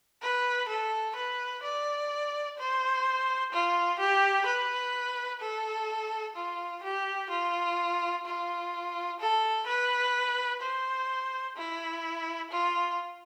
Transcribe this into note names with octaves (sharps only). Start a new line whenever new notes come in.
B4
A4
B4
D5
C5
F4
G4
B4
A4
F4
G4
F4
F4
A4
B4
C5
E4
F4